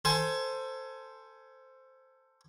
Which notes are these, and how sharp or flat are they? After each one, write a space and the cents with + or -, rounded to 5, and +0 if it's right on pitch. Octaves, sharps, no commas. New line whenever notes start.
A4 +20 C5 +0 G#5 +15